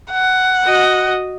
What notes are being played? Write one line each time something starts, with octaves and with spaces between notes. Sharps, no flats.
F#5
F#4 D#5